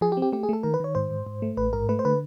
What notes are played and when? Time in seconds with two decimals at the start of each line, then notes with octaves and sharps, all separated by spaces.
0.01 F3 G#4
0.12 G4
0.17 C4
0.22 G4
0.33 A3 G4
0.43 G#4
0.49 A3 A4
0.63 D#3 A#4
0.74 B4
0.80 D#3 C#5
0.95 G#2 C5
1.11 G#2
1.26 G#2
1.42 A3
1.57 A1 B4
1.73 G#2 A#4
1.89 A3 B4
1.99 C5
2.05 D3 B4